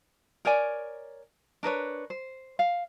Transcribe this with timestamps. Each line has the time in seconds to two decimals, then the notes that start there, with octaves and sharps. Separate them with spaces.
0.45 A#4 C#5 D5 G#5
1.63 D4 A#4 B4 C#5
2.10 C5
2.59 F5